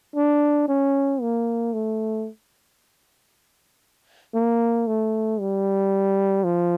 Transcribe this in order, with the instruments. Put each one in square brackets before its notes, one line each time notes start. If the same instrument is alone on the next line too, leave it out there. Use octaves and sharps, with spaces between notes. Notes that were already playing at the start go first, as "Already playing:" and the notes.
[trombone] D4
C#4
A#3
A3
A#3
A3
G3
F3